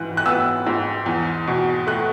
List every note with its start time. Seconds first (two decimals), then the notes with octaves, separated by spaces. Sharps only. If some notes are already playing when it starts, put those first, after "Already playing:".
Already playing: G#2 E3 F#6
0.17 F#6
0.26 B3 E6
0.66 G#2
1.06 E2
1.47 B2
1.87 A3 F#6